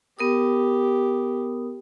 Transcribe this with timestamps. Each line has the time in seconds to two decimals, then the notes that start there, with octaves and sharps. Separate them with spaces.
0.19 B3 G4 A#4 D#6